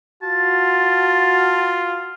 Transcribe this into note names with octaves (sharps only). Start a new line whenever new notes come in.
F4 F#4 A5